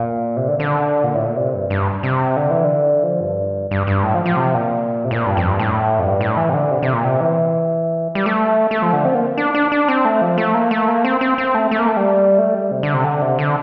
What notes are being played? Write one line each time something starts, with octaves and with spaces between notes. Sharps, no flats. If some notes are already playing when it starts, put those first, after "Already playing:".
Already playing: A#2
C3
D3
D3
A#2
A2
A#2
C3
G2
G2
C3
D3
E3
D3
F3
G2
G2
G2
A2
F3
F3
C3
A#2
C3
A2
A#2
G2
F2
G2
A2
F2
G2
A2
E3
C3
D3
C3
C3
A#2
C3
E3
G3
A3
A3
F3
D3
C4
A#3
D4
D4
D4
C4
A3
F3
A3
A#3
A3
A#3
C4
C4
C4
A3
A3
A#3
A3
G3
A3
G3
C3
D3
C3
D3
C3
D3